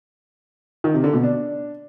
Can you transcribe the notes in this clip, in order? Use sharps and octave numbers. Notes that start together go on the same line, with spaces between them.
D#3
C3
D3
B2
D4